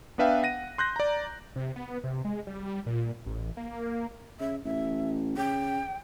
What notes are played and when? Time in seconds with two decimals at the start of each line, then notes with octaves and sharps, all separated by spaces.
0.18 B3 D4 B4 E5 F5 G5
0.43 F#5 A#6 D#7
0.78 C6 F#6 G6 A#6
0.96 D5 A#5
1.56 C3
1.76 B3
2.04 C3
2.25 G#3
2.47 G3
2.86 A#2
3.26 A1
3.57 A#3
4.40 C#3 E5
4.64 A1 E5
5.37 C#3 G5